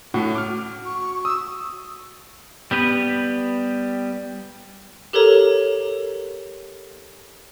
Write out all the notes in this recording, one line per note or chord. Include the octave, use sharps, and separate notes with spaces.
A2 A3 F#4
D6 F6
C#6
D#6 E6
G3 B3 G4 B4
G4 A4 A#4 C#5 A#5